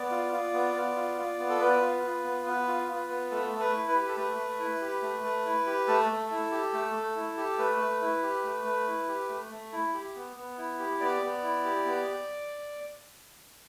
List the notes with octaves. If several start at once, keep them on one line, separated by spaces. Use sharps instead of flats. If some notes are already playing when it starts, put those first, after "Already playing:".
Already playing: B3 D5
F4
F4
B3
B3
F4
F4
B3
A4
B3 B4
F4
F4
B3
B3
F4
F4
B3
A3 A4
A3
B4
E4
B4
G4
A4
A3 B4
A3
E4
G4
A3
A3
E4
G4
A3 A4
A3
E4
G4
A3
A3
E4
G4
A3 B4
A3
E4
G4
A3
A3
E4
G4
A3
A3
E4
G4
B3
B3
E4
G4
B3 D5
B3
E4
G4
B3